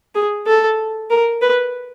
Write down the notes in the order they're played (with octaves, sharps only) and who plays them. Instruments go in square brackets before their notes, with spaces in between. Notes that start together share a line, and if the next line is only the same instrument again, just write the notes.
[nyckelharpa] G#4
A4
A#4
B4